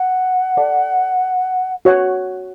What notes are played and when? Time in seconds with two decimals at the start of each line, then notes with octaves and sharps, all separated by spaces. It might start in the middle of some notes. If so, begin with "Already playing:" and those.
Already playing: F#5
0.57 A4 D5 A5
1.85 F#4 C#5 F#5